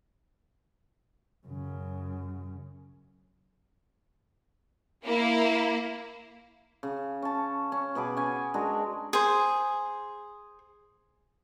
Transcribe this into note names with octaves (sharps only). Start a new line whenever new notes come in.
F#2 C#3
A#3 E4
C#3
C#4 A5
C#4
B2 G#4 B5 D6
C#4 G#5
G#3 D4 F#4 A#4
G#4 C5